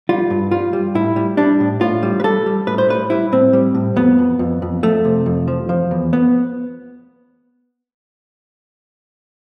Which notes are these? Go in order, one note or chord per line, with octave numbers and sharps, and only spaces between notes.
G3 F4
G2
G3 F4
G3
A2 E4
G3
G3 D4
A2
A2 F4
G3
B4
G3 A4
G3
A2 B4
C5
G3 B4
G3 E4
A2 C4
G3
A2
F2 B3
F2
F2
F2
F2 A3
C3
F2
F3
F3
E2
B3